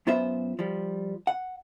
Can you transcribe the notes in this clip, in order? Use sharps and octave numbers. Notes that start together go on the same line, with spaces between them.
F#2 B3 F4 B4 C5 E5
F3 G3
F#5